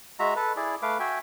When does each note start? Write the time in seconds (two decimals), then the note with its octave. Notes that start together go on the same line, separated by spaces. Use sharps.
0.19 G#3 F#4 E5 A#5
0.36 A4 B4
0.56 E4 G#4 D5
0.82 A3 B4 F5 D6
1.00 F#4 E5 G5 G#5